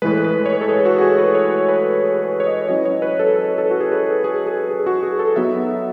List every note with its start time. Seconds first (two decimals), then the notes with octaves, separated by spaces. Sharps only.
0.02 A2 E3 G#3 B4
0.24 B4
0.46 C#5
0.53 B4
0.61 A4
0.69 G#4
0.85 F#4
0.98 F#4
1.01 G#4
1.18 B4
1.35 C#5
1.69 B4
2.03 G#4
2.25 C#5
2.40 C#5
2.47 D#5
2.68 F#3 C#4 E4 D#5
2.85 C#5
3.02 B4
3.19 A4
3.36 A4
3.58 A4
3.71 F#4
3.80 G#4
3.92 B4
4.03 A4
4.24 G#4
4.46 G#4
4.69 G#4
4.86 F#4
5.03 G#4
5.19 A4
5.36 F#3 B3 D#4 E5